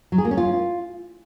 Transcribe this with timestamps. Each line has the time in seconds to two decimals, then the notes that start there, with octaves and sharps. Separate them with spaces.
0.12 F#3
0.18 G#4
0.25 A#3
0.31 C#4
0.37 F4